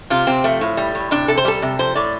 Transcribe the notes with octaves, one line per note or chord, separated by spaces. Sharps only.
C3 F4
C3 C4
F3 A3
A2
G3
A2
C3 D4
C3 A4
C5
G3 A4
C3
F3 C5
A2 D5